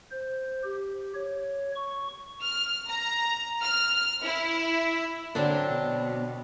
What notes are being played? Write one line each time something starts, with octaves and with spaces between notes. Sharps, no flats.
C5
G4
C#5
C#6
F6
A#5
F6
E4
D3 F#3 C4 D4
B2